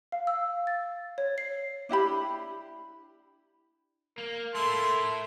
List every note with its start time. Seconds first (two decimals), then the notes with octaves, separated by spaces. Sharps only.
0.12 F5
0.27 E6
0.67 A6
1.18 C#5
1.38 C7
1.89 D4 E4 G4 B5
4.18 A#3 A#4
4.55 A3 E4 A4 C6